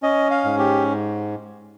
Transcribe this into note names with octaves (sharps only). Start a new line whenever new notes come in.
C#4 D#5
F5
G#2
G4